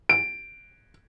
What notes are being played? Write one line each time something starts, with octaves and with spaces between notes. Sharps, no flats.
D7